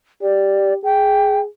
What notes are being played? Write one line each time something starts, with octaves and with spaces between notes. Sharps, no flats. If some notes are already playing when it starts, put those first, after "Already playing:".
G4 D5
G#4 G5